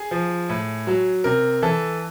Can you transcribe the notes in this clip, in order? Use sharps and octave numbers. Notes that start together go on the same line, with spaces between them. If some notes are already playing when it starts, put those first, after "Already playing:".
Already playing: G#4
F3
A2
F#3
C3 A#4
E3 A4